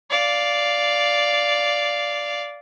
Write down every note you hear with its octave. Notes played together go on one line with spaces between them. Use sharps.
D5 F5